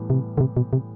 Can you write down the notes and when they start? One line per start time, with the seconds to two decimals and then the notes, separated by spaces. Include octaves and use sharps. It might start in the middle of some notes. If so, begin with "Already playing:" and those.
Already playing: A2 E3 G3 B3
0.10 C3
0.38 D3
0.40 C3
0.57 B2
0.73 C3